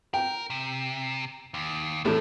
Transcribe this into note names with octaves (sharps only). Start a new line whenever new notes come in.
A#4 G5
C3
D#2
E2 A2 A3 C4 A5